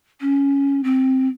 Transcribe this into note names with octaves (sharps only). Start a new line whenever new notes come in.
C#4
C4